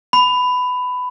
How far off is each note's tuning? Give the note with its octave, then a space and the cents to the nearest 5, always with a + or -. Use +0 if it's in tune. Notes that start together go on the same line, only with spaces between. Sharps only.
B5 +15